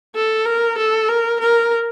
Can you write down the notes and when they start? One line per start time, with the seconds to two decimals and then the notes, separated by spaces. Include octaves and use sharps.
0.15 A4
0.45 A#4
0.78 A4
1.08 A#4
1.40 A#4